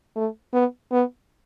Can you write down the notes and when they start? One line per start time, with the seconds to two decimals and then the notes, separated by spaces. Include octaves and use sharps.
0.16 A3
0.53 B3
0.91 B3